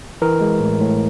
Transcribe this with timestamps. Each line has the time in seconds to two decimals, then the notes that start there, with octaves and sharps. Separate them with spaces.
0.22 E3 A#4
0.41 G#3
0.60 A2
0.80 A2